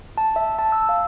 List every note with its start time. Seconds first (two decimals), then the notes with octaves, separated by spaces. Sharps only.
0.18 A5
0.36 E5
0.59 A5
0.72 E6
0.89 F5